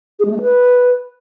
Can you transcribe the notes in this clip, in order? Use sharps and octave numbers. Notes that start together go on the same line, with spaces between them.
G#4
G#3
A3
G#3
B4